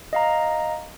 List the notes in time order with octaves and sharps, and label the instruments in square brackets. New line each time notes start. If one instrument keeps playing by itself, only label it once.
[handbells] D#5 F5 A#5